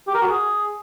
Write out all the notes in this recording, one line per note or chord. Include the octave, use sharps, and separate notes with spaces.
G4
A#4
F#4
G#4